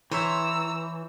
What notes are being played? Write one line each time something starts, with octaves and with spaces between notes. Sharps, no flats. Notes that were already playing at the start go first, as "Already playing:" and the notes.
E3 C5 C#5 E5 A#5 E6